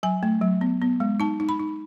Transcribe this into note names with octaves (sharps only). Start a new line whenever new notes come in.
F#3 G#5
A3
F#3
B3
B3
G#3
D#4 A5
D#4
B5
D#4